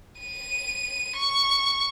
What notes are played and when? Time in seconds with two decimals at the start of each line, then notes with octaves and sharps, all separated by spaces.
0.20 D#7
1.16 C#6